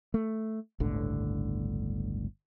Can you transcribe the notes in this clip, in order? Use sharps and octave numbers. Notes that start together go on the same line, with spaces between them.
A3
G1 C#2 A2 D3